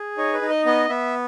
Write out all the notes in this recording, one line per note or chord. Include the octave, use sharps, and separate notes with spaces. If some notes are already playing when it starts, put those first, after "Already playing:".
Already playing: G#4
D#4 C#5
B4
D#4
D#5
B3 D#5
B3 E5